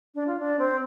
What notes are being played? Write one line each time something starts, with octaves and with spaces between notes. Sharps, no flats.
D4
F4
D4
C4